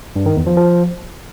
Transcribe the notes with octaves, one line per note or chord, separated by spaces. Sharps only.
G2
D#3
E2
F3
F3